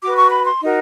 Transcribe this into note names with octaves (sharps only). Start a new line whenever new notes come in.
F#4 B4 D6
C#6
B5
C6
D#4 F#4 A#4